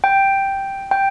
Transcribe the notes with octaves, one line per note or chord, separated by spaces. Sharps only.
G5
G5